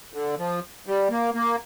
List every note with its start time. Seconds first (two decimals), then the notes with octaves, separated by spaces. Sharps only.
0.13 D3
0.38 F3
0.87 G3
1.10 A#3
1.34 A#3